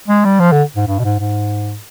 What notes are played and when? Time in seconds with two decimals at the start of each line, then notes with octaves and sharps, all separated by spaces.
0.08 G#3
0.24 G3
0.40 F3
0.52 D3
0.76 G#2
0.87 G2
0.99 B2
1.04 G#2
1.20 G#2